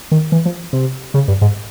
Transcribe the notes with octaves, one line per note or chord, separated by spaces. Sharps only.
D#3
E3
F3
C3
C#3
G2
G#2